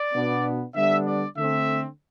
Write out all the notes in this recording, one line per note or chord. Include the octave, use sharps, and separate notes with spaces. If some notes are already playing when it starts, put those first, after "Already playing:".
Already playing: D5
B2 B3 D4
D3 G3 B3 D4 E5
D5
D3 A3 C4 E5